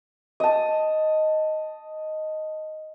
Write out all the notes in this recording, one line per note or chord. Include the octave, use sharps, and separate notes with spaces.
D#5 A5